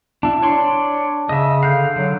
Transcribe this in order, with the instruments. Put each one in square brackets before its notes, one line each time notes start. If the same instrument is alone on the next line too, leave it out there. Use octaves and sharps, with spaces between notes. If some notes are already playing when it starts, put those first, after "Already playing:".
[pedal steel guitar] D4 E4 [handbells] A5
[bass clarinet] D4 [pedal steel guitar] C#5 D5 C6
[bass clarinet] C#3 [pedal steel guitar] D#5 E5
[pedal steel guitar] D3 F5 [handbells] F#6 G6
[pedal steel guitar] D3 [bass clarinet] F#3